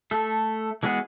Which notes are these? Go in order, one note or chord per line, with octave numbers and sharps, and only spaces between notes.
A3 A4
E3 G#3 B3 F#4 G#4